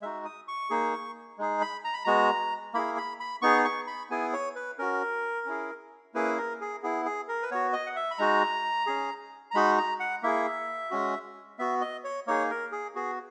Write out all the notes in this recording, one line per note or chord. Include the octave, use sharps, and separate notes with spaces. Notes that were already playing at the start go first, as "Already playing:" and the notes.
G#3 D#4 F#4 E5
D#6
C#6
A#3 D#4 G#4
G#3 D#4 G#4
B5
A#5
B5
G#3 B3 F#4 A#5
A#3 E4 G#4 B5
B5
B5
B3 D#4 G#4 C#6
C#6
B5
B3 E4 G#4 G#5
C#5
B4
C#4 F#4 A#4
C#4 E4 G#4
A#3 C#4 E4 G#4 B4
A#4
G#4
B3 E4 G#4
G#4
A#4
B4
B3 F#4 C#5
D#5
F#5
E5
B5
G#3 D#4 F#4 A#5
C#4 G#4
A#5
G#3 D#4 F#4 B5
A#5
F#5
A#3 E4 G#4 E5
G#3 C#4 F#4
B3 F#4 E5
D#5
C#5
A#3 D#4 G#4 C#5
A#4
G#4
B3 F#4 G#4